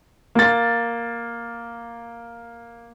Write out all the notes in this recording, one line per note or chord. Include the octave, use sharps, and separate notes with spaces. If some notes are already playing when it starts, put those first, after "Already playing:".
A#3 A6